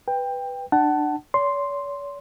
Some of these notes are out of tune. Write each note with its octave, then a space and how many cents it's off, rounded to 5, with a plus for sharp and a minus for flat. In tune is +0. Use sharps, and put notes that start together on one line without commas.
B4 +0 G5 +15
D4 +25 F#5 +25 A5 +0
C#5 +45 C6 +0